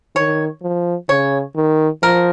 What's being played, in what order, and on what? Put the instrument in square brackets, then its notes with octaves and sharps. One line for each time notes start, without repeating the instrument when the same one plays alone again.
[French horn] D#3 [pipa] C#5
[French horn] F3
[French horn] C#3 [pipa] C#5
[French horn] D#3
[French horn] F3 [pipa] A#4